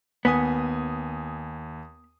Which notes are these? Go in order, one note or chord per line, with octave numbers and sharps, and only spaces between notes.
D#2 B3 G#5 D#6